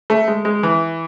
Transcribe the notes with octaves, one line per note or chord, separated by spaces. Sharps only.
A3
G#3
G#3
E3